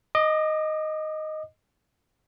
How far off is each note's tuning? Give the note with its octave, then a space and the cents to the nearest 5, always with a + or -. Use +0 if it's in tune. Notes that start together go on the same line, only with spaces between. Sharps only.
D#5 +0 D6 +35